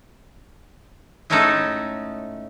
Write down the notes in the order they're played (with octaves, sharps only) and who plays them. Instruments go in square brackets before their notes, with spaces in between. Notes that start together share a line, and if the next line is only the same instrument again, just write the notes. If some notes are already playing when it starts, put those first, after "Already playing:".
[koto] A2 G#3 A3 C#4 D#4 A4